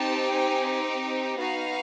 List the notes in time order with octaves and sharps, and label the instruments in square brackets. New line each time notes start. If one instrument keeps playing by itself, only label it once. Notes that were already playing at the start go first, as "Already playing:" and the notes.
Already playing: [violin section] C4 D#4 G4 A5
G#5
G5
B3 D#4 F#4 F5